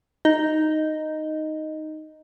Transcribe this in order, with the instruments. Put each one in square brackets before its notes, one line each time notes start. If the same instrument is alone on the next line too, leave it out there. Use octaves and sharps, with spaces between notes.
[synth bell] D#4 D#5